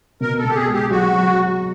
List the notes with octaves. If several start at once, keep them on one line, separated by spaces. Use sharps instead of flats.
B2 A#4
A4
B2 G4
G#4
G#3
G4
F#3 F#4
F#3